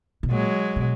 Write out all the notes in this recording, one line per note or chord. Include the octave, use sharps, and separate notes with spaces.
B2
A#2 F#3 G#3
B2